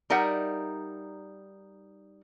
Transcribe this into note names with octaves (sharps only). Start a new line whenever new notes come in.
G3 D#4 A#4 E5 F#5